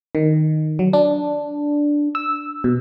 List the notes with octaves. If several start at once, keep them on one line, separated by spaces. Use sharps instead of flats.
D#3
F#3
D4
E6
B2